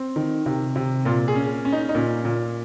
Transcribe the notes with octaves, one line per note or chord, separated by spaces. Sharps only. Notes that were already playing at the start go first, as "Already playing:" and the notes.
Already playing: C4
D#3
C3
C3
A#2 F4
G#4
C#4
C#4
D#4
D#4
A#2 C#4
A#2